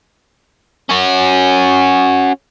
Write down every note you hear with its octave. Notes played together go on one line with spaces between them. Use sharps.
C#4 F#4